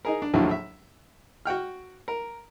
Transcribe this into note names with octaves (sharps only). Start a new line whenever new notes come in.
D#4 G#4 A#4
D4
A#1 D#2 A2 D3 F3 F#3
E5
F#4 F#5 G5 F6
A#4